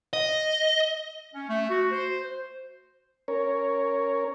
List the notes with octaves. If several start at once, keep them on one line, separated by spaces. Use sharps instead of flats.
D#5
C#4
A3
F#4
C5
C#4 A#4 C#5